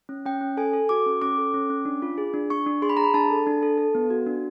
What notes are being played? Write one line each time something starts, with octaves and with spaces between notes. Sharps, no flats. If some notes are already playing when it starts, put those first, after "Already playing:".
C#4
C#4 G5
C#4
A4 G#5
A4
F#4 D6
C#4
C#4 D6
A4
C#4
C#4
D4
F4
G#4
D4
D4 C#6
D4
G#4 C6
B5
G#4 A#5
B5
D4 A5
A4
D4
A4
A4
B3
F#4
D4